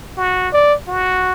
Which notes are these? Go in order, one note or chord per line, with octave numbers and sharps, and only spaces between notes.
F#4
D5
F#4